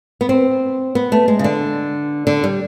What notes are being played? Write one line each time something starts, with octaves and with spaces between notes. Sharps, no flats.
B3
C4
B3
A3
G#3
C#3
D3
D3
G3